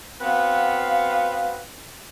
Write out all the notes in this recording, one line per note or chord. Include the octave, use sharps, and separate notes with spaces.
B3 C4 F#4 B4 F5